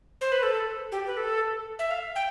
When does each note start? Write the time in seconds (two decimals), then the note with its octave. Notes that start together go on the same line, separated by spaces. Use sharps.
0.21 C5
0.32 B4
0.43 A4
0.92 G4
1.07 B4
1.17 A4
1.79 E5
1.91 F5
2.16 G5